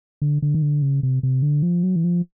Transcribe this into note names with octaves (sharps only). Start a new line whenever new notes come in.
D3
D3
D#3
D3
C#3
C3
C3
D3
F3
F#3
E3
F3